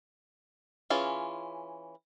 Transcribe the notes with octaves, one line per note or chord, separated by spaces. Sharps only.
E3 C#4 F4 G#4